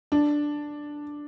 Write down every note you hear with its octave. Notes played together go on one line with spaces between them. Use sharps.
D4